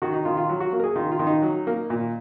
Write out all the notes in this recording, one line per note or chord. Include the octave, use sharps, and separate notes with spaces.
D#3 F#4
D#4
D#3 F4
F4
F#3
F#4
A#3
A#4
G#4
D#3 F4
F4
D#3
D#4
F#3
A#3
A#2